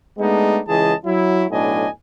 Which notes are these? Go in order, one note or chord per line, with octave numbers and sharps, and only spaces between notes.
G#3 A3 B3 D4 D#4
C#2 E3 G#4 D#5 A5
F#3 E4
B1 A2 D4 D#5 G#5